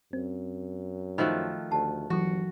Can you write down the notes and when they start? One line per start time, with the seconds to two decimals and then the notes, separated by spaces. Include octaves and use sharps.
0.13 F#2 C4
1.18 D#3 F3 A3 F#4 C5 B5 F6 F#6
1.71 D2 G4 A5
2.10 G1 E3 F#3 F#4